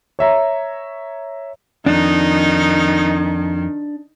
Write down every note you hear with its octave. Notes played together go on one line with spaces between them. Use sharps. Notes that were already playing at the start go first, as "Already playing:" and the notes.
C#5 E5 A#5
F2 D#3 D4 D#4